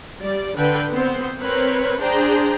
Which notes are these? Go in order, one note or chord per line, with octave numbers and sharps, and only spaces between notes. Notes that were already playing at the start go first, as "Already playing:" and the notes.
G3 D5
D3 B4 G5
B3 C4 C5
C4 A#4 B4 C#5
D4 G#4 C5 G5 A#5